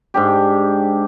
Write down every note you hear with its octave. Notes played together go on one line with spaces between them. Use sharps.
G#2 D4 G4